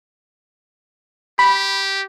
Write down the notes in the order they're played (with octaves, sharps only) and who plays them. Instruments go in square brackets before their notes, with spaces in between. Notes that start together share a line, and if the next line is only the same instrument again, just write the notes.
[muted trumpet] G4 [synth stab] B5